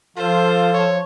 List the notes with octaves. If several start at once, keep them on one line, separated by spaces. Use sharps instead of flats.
F3 F4 A4 C5
C#5